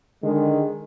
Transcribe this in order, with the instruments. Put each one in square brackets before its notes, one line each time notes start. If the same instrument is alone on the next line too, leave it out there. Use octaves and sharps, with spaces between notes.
[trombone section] D3 D#3 G#3